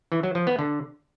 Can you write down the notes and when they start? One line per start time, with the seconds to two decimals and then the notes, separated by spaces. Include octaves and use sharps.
0.12 E3
0.23 F#3
0.35 F3
0.47 B3
0.59 D3